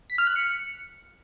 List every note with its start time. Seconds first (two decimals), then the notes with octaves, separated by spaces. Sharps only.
0.10 B6
0.18 F6
0.27 F#6
0.36 C#7